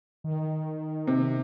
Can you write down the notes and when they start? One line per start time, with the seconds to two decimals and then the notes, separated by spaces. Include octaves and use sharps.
0.24 D#3
1.07 C3